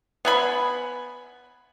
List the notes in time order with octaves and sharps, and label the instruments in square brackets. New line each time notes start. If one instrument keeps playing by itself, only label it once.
[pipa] B3 G#5 B5